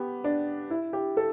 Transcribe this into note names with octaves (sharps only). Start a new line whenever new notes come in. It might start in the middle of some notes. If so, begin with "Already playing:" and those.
Already playing: B3 G4
D4
E4
G4
A4